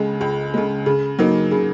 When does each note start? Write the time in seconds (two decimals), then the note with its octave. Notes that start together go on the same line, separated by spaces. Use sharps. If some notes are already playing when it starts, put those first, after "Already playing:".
Already playing: C#2 C#3 G#3
0.21 C#2
0.54 C#3 G#3
0.86 C#3
1.19 F#3 A#3 D#4
1.51 C#3